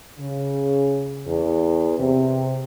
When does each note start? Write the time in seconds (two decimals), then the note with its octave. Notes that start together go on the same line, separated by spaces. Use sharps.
0.19 C#3
1.27 E2
1.98 C3